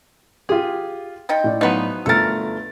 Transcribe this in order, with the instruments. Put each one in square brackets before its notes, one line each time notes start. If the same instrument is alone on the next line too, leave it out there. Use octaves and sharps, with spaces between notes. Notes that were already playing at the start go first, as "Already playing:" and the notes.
[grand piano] F4 G4 [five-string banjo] G#4
[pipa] F3 D#4 G5
[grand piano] A2 D5
[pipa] F3 B4 [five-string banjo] F#3 B3 D#4
[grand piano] G1 A3 A6 [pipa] A4 A#4